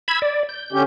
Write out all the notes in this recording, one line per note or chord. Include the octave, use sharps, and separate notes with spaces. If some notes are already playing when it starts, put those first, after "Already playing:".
B5 E6 G#6
D5
G6
D3 C#4 G4